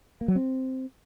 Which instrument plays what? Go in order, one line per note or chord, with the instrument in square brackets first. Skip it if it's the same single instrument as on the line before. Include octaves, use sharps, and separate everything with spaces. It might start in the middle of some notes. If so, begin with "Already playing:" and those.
[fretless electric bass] A#3
F#3
C4